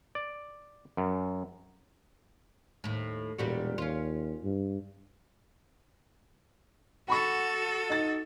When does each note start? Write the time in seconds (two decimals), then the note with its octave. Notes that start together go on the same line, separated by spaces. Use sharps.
0.15 D5
0.97 F#2
2.84 D#2 A2
3.39 E1 A#2 G3 F#4
3.78 D#2 C#4 F4
4.44 G2
7.08 F#4 A4 F#5 B5 C#6
7.89 D#4 A6